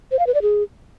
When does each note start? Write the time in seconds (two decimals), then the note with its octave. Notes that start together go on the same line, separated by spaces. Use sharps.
0.11 C5
0.19 F5
0.27 B4
0.34 D5
0.42 G#4